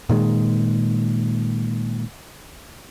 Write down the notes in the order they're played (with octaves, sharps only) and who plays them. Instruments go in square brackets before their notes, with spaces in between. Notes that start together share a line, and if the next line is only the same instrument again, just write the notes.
[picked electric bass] A#2 D#3 G#3